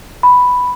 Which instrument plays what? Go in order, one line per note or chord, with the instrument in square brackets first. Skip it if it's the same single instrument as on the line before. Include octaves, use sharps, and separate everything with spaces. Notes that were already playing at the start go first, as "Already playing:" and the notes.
[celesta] B5